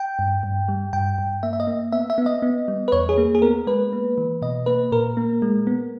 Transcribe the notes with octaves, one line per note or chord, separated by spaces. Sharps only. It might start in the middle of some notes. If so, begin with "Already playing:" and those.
Already playing: G5
G2
G2
G3
G2 G5
G2
A#3 E5
E5
D#5
A#3
B3 E5
E5
B3
D#5
B3
G3
B4
E2 C#5
G#4
A#3
G#4
B3 A#4
G#3 B4
A#3
E3
B2 D#5
A#3 B4
A#2 A#4
A#3
G#3
B3